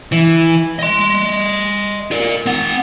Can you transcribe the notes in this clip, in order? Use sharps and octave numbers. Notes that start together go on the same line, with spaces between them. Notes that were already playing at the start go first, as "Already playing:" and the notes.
E3
D#5 C6
F4 A#4
C4 F#5